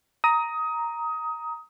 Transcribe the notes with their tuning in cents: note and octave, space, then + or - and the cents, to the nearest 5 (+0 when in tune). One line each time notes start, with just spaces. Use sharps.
A#5 +0 D#6 +20